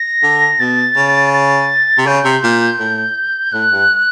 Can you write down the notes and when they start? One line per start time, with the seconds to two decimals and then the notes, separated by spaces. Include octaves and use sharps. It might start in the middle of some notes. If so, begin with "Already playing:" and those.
Already playing: A#6
0.23 D3
0.59 B2 A6
0.96 C#3
1.33 A6
1.98 C3
2.07 C#3 G6
2.25 C3
2.43 A#2
2.79 A2
3.52 A2 F#6
3.72 G2